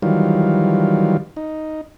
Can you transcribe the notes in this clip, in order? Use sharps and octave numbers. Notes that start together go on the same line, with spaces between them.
D#3 E3 F#3 G3 F4
D#4